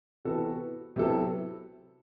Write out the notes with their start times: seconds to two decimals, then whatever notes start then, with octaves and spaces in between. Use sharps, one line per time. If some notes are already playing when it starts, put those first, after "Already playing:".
0.25 C3 E3 B3 F#4 A4
0.96 C3 F#3 B3 E4 A4